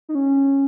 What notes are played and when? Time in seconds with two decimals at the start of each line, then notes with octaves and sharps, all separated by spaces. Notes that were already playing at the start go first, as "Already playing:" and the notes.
0.09 D#4
0.15 C#4